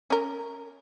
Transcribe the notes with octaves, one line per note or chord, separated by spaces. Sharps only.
C#4 A#4